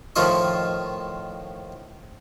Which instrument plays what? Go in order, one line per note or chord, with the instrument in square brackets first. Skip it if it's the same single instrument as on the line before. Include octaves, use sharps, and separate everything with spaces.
[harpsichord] A2 D#3 F3 F4 D#5 C#6